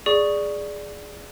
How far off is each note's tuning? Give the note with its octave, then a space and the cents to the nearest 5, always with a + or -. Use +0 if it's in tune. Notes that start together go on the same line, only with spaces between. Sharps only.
G#4 +0 D5 +0 C#6 +0